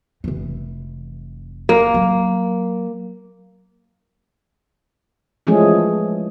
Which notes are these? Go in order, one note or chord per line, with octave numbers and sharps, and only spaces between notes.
F1 E3
A#3
F#3
E3 F3 G#3 A3 C#4 G#4